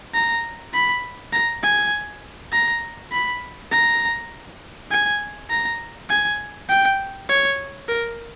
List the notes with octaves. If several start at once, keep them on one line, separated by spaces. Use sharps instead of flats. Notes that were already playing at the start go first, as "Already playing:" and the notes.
A#5
B5
A#5
G#5
A#5
B5
A#5
G#5
A#5
G#5
G5
C#5
A#4